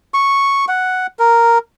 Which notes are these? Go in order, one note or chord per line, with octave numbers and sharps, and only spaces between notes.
C#6
F#5
A#4